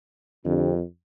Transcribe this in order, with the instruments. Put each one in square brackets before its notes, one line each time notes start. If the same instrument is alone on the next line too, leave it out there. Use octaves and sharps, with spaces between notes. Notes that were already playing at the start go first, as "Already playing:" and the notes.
[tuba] F2 [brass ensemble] D3 G3 C4